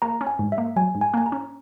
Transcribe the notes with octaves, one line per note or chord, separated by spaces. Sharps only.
A#3 A#5
C#4
G#5
G#2
E5
A#3
F#3 G#5
G#2
G#5
A#3 G#5
A#5
C#4